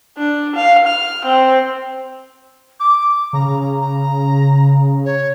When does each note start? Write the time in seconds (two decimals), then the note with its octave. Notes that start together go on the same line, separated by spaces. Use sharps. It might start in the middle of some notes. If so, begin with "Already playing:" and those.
0.18 D4
0.55 F5
0.87 F6
1.25 C4
2.80 D6
3.33 C#3 A#5
3.81 A#5
5.05 C#5